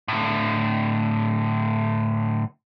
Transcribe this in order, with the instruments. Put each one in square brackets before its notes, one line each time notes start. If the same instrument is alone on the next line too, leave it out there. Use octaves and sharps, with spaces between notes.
[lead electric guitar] A2 D3